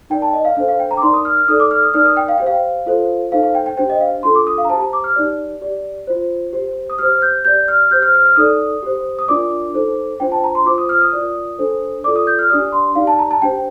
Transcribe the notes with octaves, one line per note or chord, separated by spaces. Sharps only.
D#4 A#4 D5 G5
A5
D#5
F5
D4 A4 C5 F5
F5
G5
A#5
D6
D#4 A#4 D5 C6
D#6
F6
F6
D#4 A4 D5 D#6
D6
F6
D#6
D#4 A#4 D5 F6
D#6
G5
F5
G4 C5 G5
F5
F4 A4 C5
D#4 A4 C5 F5
F5
G5
G5
D4 G4 C5 G5
D#5
F5
D4 F4 A4 C6
D6
D#6
F5
A#5
G4 C5 A5
A#5
D6
F6
D#4 G4 D5
G4 D5
F4 C5
G4 C5
D#6
G4 C5 F6
G6
G4 D5 G6
F6
G4 C5 G6
F6
F6
F6
D#4 A4 D5 D#6
G4 C5
D#6
D4 F4 A#4 D5 D6
D#4 A4 C5
D4 F4 C5 G5
A5
A#5
C6
F4 C5 D6
D#6
F6
D#6
F4 A#4 D5
D4 A4 C5
F4 A4 D5 D6
D#6
G6
F6
D4 G4 D5 D#6
C6
D#4 G4 D5 F5
A5
A#5
A5
D4 G4 C5 G5